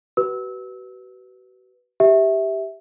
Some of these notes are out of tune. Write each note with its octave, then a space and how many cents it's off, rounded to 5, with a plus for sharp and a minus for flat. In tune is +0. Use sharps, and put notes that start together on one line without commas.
F#4 +40 B4 +0 E6 -25
G4 +0 E5 -15